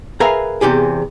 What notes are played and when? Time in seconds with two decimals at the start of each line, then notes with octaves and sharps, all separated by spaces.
0.20 G#4 A#4 B4 E5 F5 A#5
0.61 E2 C3 G4 G#4